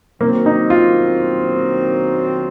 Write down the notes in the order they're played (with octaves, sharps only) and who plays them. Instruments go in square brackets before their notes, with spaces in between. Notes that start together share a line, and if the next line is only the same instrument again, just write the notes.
[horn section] D#3 F#3 C4 [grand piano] A#3
[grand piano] D#4
F4